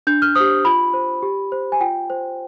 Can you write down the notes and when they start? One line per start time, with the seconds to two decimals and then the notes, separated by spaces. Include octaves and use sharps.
0.07 D4 G6
0.22 F6
0.35 G4 C5 D#6
0.65 F4 B5
0.94 C5
1.22 G4
1.52 C5
1.72 G#5
1.81 F4 G5
2.10 C5